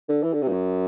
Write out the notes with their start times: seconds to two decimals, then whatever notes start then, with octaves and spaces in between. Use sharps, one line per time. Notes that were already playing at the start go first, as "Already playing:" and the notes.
0.09 D3
0.23 E3
0.33 D3
0.42 C3
0.48 G2
0.52 F#2